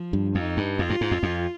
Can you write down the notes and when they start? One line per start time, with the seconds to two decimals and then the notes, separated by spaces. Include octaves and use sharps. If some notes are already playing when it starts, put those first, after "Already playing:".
Already playing: F3
0.13 G2
0.35 F2 D#4
0.57 G2
0.79 F2 F4
0.90 G2
1.01 G#2
1.11 F2
1.23 F2